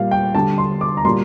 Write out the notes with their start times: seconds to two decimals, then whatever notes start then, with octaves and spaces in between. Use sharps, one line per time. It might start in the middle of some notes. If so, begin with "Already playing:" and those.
Already playing: A#2 G3 F5
0.11 G5
0.35 D3 G3 A5
0.58 C6
0.81 D6
0.97 A#5
1.05 A#2 G3 C6